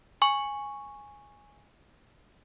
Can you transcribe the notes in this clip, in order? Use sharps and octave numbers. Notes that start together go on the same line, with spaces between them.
G#5 C#6